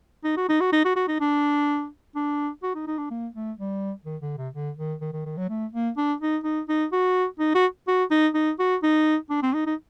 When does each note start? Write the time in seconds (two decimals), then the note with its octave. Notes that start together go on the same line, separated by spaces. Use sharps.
0.24 D#4
0.37 F#4
0.49 D#4
0.60 F#4
0.72 D#4
0.85 F#4
0.96 F#4
1.08 D#4
1.20 D4
2.16 D4
2.63 F#4
2.75 D#4
2.87 D#4
2.98 D4
3.11 A#3
3.35 A3
3.58 G3
4.05 D#3
4.22 D3
4.37 C3
4.53 D3
4.77 D#3
5.01 D#3
5.13 D#3
5.25 D#3
5.37 F#3
5.49 A3
5.73 A#3
5.97 D4
6.21 D#4
6.44 D#4
6.69 D#4
6.92 F#4
7.39 D#4
7.55 F#4
7.88 F#4
8.11 D#4
8.34 D#4
8.59 F#4
8.83 D#4
9.30 D4
9.43 C4
9.54 D#4
9.66 D#4